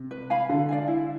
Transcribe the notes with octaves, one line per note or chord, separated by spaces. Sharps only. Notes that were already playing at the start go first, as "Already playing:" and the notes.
Already playing: C3
B4
F5 G#5 B5
D3 A4
D5 F5 G#5
E4